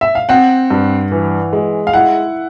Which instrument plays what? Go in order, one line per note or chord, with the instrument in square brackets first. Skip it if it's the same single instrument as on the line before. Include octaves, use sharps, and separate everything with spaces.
[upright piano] E5
F5
[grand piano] C4 [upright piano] F#5
[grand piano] G2
E3
G#3
[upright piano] F5
[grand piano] E4 [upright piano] F#5